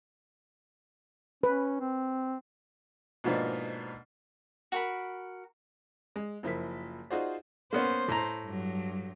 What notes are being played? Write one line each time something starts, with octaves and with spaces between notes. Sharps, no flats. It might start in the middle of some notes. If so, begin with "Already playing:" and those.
C#4 B4
C4
G#2 B2 F3 A#3 D4 D#4
F#4 A#4 B5
G#3
F#1 F3 E4 A#4 B6
D#4 F4 F#4 G#4 C5 D5
A#3 B3 C#4 C5
A2 A#5
G2 F#3